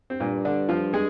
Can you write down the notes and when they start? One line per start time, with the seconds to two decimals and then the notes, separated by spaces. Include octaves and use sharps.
0.10 C4
0.20 G2 A#2 A#3
0.45 D3 D4
0.69 F3 F4
0.93 G#3 G#4